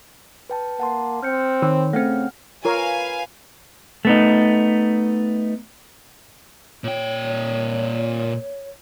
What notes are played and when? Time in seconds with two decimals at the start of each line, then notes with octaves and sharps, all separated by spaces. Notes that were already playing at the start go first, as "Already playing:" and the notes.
0.50 B4 G5 A5
0.80 A#3 F#5 A5 C6
1.23 C4 F6 G6 C#7
1.62 D#3 C#5 G5
1.93 C#3 A3 C4 F#5 G5 F6
2.65 F4 A#4 B4 C#5 F5 G#5
4.05 A3 B3 D#4
6.84 A#2 C#5 G5